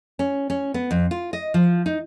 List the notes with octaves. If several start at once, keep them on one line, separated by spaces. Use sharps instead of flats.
C#4
C#4
B3
F2
F4
D#5
F3
D#4